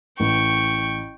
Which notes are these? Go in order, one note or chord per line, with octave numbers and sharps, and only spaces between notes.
A1 G5 C#6